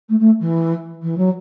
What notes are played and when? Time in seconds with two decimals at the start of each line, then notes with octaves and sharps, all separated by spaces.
0.09 A3
0.19 A3
0.40 E3
1.02 E3
1.17 F#3